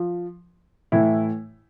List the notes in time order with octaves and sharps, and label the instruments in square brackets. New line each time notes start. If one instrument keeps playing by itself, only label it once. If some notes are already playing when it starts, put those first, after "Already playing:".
Already playing: [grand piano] F3
A2 E3 E4